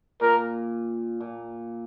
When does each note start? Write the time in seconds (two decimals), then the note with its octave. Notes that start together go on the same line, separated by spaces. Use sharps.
0.21 A#2 A#4
1.20 A#2